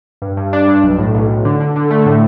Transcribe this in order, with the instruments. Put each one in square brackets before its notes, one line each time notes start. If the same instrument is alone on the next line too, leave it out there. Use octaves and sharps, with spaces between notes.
[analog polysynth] G2
G2
D4
G2
B1
A2
B1
B1
D3
D3
D3
A3
A2